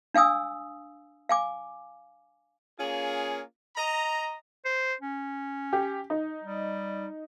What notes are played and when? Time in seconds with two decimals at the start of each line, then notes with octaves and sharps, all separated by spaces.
0.14 D4 F5 G#5 D#6 E6
1.29 F5 G#5 D6
2.79 A#3 C#4 F4 G#4
3.77 D#5 A#5
4.65 C5
5.01 C#4
5.73 G4
6.10 D#4
6.44 G3